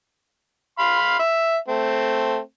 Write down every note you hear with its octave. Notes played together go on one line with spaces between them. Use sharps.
F5 B5 C6
E5
A3 C4